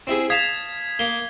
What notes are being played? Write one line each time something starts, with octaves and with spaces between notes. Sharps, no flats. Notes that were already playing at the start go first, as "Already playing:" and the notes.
C4 E4 G#4
F5 A5 D#6 G#6 B6
A#3 G7